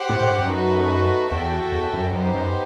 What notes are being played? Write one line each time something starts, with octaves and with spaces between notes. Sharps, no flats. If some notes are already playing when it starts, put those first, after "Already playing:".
Already playing: G4 C5 F#5
A2
A2
G2
F#2
A3 D#4 F#4 B4
E2 F#4 A4 E5 G5
E2
F#2
F#2 B3 D#4 G4 C5
F#2